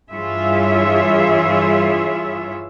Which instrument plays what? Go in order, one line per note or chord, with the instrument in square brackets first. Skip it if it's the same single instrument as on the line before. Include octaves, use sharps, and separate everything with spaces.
[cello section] G2 E3 F4 G#4 C#5 E5